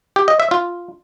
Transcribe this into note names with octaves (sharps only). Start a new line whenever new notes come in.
G4
D#5
E5
F4